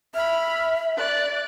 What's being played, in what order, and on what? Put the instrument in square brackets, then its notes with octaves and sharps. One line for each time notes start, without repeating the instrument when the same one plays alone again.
[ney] E5 [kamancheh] B5 F6
[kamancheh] D5 F#6